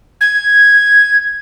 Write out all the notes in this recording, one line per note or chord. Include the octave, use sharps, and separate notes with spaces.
G#6